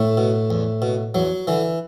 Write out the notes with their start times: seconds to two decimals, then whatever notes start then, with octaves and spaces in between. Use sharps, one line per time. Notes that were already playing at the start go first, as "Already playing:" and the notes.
Already playing: A2 A3
0.17 B2
0.50 E2
0.82 B2
1.14 E2 F#3
1.47 D3 E3